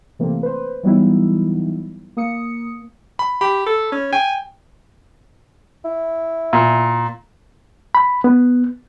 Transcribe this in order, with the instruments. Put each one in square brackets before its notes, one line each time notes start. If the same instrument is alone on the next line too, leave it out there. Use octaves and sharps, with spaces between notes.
[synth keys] C3 E3 A3 A#3 C4
B4 C5
E3 F#3 G3 B3 D#4 E4
A#3 D#6 C#7
[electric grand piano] B5
[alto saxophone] G4 [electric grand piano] B5
[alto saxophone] A4
C#4
[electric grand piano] G5 [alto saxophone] G#5
[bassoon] E4
[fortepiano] A#2
[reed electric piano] B5
B3